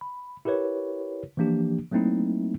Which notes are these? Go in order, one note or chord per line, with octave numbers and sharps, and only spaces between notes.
B5
E4 G4 A#4 B4 C#5
E3 F3 A#3 D4 G4
F#3 A3 A#3 C4 D#4 E4